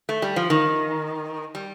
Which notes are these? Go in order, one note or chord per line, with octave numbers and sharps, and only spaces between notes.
A3
G3
F3
D#3
G3